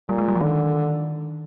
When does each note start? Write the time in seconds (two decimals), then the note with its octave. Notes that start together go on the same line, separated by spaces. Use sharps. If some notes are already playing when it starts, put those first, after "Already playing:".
0.09 A#2 G3
0.18 G#3
0.28 G3
0.36 F3
0.41 D3 D#3